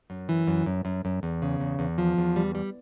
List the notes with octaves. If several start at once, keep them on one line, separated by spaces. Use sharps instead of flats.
F#2
E3
F#2
F#2
F#2
F#2
E2
C#3
E2
E2
F3
E2
G3
G3